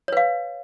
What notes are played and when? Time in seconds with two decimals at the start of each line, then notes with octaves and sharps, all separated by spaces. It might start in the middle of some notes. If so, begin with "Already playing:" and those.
0.08 C#5
0.12 B4
0.17 F5